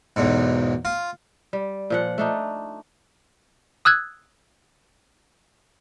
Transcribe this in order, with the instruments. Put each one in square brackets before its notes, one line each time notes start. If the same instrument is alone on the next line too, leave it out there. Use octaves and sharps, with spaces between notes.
[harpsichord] B1 E2 G#2
F4
[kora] G3
A#2 F3 F#5
A3 D4 D#4
[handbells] D#6 E6 F#6 G#6